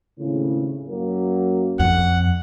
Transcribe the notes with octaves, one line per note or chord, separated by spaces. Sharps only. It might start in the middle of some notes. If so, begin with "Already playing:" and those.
G#1 A2 C#3
F#2 F#3 A#3
F2 F#5